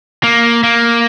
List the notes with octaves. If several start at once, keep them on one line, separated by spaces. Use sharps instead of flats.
A#3
A#3